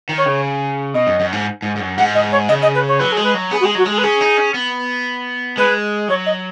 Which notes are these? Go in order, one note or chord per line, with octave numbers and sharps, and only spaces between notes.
D#3
C#5
C#3
B2 D#5
F#2
F#2
G#2
G#2
G#2
F#2
G#2 F#5
D#5
C#5
C#3 D#5
D#5
B4
C#5
F#3 B4
G#4
G#3
B4
F#3
B3 G#4
F#4
G#3 G#4
F#3 F#4
G#3 G#4
B4
C#4 G#4
D#4
C#4
B3
G#3 B4
F#3 C#5
D#5